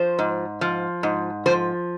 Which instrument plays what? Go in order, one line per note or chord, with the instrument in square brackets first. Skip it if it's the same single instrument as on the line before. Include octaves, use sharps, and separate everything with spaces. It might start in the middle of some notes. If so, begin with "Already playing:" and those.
Already playing: [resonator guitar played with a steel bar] F3 C5
G#2
F3
G#2
F3 C5